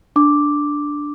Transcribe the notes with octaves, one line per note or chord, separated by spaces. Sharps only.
D4 D6